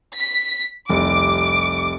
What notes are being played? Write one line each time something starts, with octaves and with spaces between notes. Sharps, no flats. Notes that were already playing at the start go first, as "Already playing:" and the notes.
B6
F1 C2 D6